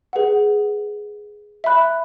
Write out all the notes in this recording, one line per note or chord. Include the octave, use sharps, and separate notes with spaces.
G#4 B4 F#5
E5 B5 F#6